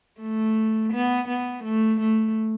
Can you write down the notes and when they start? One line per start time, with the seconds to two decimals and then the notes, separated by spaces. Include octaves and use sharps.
0.21 A3
0.93 B3
1.28 B3
1.64 A3
2.01 A3